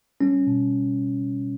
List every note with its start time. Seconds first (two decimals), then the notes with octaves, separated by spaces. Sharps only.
0.21 G3 C#4
0.47 B2